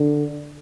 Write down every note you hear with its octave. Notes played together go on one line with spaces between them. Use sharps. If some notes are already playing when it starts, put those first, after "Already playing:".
Already playing: D3